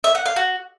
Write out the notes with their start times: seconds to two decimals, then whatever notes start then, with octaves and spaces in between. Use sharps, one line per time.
0.04 E5
0.15 F#5
0.26 F5
0.36 F#4